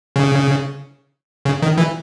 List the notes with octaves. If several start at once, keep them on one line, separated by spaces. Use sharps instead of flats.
C#3
C#3
D#3
E3